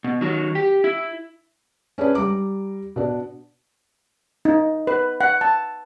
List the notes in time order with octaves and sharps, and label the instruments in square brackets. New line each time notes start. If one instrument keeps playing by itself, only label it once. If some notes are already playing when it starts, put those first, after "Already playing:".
[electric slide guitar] B2
D#3 F#3
G4
E4
[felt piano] C#4 D4 G#4 B4
G3 A#5 D6
B2 D4
[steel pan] D#4
B4
F#5
A5